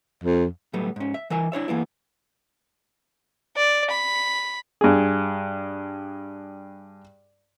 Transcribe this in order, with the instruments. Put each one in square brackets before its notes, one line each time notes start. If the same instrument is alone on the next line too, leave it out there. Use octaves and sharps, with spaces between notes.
[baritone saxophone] F2
[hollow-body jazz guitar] A2 F#3 G3 A3 B3
G#2 C#4
E5
E3 A#4 E5 G#5
D4 E4 C#5 E5
E3 A#3 B3 E4
[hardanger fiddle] D5
B5
[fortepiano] G2 G#4